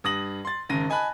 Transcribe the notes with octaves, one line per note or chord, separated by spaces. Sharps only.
G2 D#6 A#6 F#7
C6 A6
G#1 C#3 A#6 D#7
D#5 G#5 A5 B5 F#6